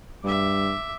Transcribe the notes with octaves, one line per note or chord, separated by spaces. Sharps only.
G2 E5 D6